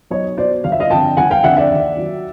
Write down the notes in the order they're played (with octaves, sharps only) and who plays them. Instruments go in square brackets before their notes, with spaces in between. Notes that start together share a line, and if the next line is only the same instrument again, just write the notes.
[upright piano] B1 C#5 D#5
B2 F#3 C5 D5
G1 F5
E5
D#5 F5
F2 D3 G5 A5
G1 F#5 G#5
F5 G5
F2 D3 E5 F#5
D5 E5
D#2
D#3 F#3